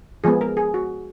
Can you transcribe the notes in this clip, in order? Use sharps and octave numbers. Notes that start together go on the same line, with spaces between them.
F3 G#3 B3 G#4
A#4
G#4
F#4